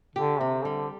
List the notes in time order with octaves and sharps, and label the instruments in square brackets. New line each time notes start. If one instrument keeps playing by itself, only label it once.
[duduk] D3 [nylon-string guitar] G4
[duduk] C3 [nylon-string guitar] C4
[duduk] D3 [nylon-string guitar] G3